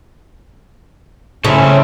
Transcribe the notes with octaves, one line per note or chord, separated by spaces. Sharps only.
C#3 A3 C#4 E4 A4 C5